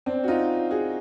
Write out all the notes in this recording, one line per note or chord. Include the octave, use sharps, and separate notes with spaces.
C4 D4
F#4
D#4 F4
F#4 G#4